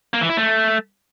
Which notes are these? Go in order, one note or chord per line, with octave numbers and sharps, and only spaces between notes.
A#3
E3
E4
A3